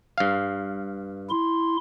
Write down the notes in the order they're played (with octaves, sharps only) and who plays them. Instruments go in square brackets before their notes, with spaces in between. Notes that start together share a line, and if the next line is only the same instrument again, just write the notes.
[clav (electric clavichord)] G2 F5
[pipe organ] E4 C6